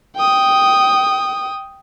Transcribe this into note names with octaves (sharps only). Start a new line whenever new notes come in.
G5 D#6